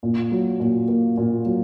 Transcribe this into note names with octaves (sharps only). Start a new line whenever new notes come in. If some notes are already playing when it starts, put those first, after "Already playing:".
A#2
F#3
A#2
A#3
A#2
F#3